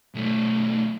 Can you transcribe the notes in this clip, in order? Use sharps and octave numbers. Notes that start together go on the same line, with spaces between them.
B1 A3